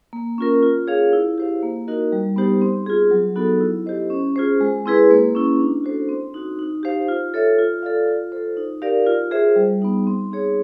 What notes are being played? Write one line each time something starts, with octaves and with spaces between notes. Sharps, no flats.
A#3
C#4 F4 A#4
F4
G#4 C#5 F5
E4
G4 C5 F5
A#3
D#4 F#4 A#4 D#5
G3
B3 D#4 G4 C5
C4
F4 G#4
F#3
B3 D#4 F#4 A4
E4
G4 C5 D#5
C#4
F4 G#4 C5
G#3
C4 E4 G#4 B4
A#3
C#4 E4
D4
F#4 A4 C5
C4
D#4 F#4
D#4
G4 C5 F5
F4
A4 C#5 E5
F4
A4 D5 F5
F4
A4 C5
D#4
G4 A#4 D5 F5
F4
G#4 C5 E5
G3
B3 D#4
C4
D#4 G#4 C#5